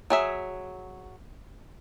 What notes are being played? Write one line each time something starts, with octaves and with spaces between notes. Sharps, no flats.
F#3 G#4 E5